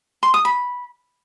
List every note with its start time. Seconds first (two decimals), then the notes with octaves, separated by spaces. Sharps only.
0.23 C6
0.34 D#6
0.45 B5